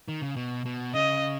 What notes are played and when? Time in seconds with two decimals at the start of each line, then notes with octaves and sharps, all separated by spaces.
0.08 D#3
0.22 C#3
0.36 B2
0.66 B2
0.94 C#3 D#5